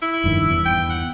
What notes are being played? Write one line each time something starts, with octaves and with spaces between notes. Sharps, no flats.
E4
F1 G2 D#3
E2
G5
F#5